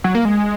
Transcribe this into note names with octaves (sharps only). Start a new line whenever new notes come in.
F#3
A#3
G#3